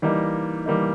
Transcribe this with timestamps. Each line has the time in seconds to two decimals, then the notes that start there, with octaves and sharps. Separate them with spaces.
0.02 E3 G3 A#3 D#4
0.66 E3 G3 A#3 D#4